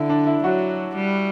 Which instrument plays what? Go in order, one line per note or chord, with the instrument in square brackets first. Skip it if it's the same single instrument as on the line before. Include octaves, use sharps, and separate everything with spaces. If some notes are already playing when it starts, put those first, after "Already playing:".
Already playing: [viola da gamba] D3 [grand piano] E4
[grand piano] D4
E4
[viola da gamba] F#3 [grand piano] F#4
[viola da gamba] G3